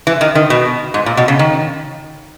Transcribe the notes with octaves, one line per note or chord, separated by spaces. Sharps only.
E3
D#3
D#3
B2
G#2
A#2
B2
C#3
D#3